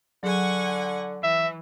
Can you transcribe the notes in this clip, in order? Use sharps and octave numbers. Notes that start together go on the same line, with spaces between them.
D3 F#3 G#4 F#5 G#5 C#6
E3 E5